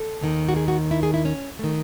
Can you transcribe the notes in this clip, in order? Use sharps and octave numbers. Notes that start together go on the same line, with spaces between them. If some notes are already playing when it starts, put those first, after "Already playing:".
Already playing: A4
D#2 D#3
F#4
G#4
F#4
E4
G#4
E4
C#4
D#3 A3